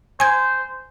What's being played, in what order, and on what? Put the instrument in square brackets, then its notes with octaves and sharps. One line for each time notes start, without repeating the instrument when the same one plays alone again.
[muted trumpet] C5 [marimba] G#5 G#6